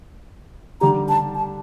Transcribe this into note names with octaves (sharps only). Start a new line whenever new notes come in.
D3 G3 D4 G4 A#5
A5
A5